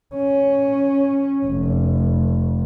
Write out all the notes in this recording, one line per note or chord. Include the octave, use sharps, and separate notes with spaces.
C#4
F1